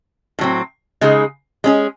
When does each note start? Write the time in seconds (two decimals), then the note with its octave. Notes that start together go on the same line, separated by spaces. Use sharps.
0.39 A2 F#3 C4
1.01 C#3 G#3 D#4 G#4
1.64 G#3 C#4 G#4